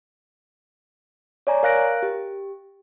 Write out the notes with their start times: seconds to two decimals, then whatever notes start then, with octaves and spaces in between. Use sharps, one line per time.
1.47 C#5 D5 G#5 A#5
1.63 A#4 F5 F#6 A#6 D7
2.03 G4